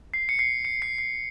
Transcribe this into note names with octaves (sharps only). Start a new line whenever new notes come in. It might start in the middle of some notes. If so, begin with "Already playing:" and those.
C7
C#7
C7
C#7
C7
C7